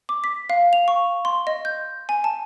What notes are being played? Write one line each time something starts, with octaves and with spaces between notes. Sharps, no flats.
D6
B6
F5
F7
C#6
C6
D#5
G6
G#5
A5